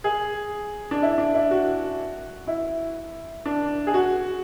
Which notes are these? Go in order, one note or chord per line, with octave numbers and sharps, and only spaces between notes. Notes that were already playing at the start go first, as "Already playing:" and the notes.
G#4
D4
E4
D4
E4
F#4
E4
D4
G#4
F#4